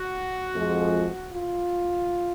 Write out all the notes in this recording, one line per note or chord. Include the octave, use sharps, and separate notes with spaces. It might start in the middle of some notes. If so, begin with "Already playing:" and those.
Already playing: F#4
F2 F3 G#3
F4